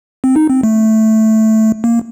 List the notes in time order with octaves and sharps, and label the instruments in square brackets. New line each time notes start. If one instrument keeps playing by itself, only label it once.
[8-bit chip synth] C4
D#4
C4
A3
A#3